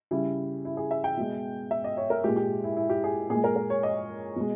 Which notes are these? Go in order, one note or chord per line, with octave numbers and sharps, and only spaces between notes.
C#3 G3 E4
E4
G#4
E5
G5
B2 G#3
E5
D#5
C#5
A#4
A#2 G#3 G4
G4
E4
E4
G4
G#4
A#2 G#4
G#3
A#4
A#4
C#5
D#5
B2 G#3